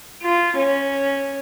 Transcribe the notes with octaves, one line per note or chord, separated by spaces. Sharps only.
F4
C#4